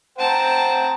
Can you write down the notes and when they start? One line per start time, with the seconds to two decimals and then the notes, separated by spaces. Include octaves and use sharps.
0.18 C5 F#5 G5 A5 A#5